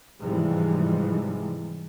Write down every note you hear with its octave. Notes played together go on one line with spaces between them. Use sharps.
G#2 C3 E3 F3 G3 G#3